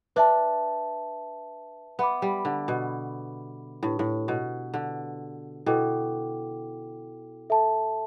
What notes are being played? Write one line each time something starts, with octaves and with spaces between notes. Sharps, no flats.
D4 B4 E5 A5
B3 B4 E5 B5 D6
G3
D3
B2
A2 D4 G4 B4
A2
B2
D3
B2 E4 A4 G5 D6
A4 E5 A5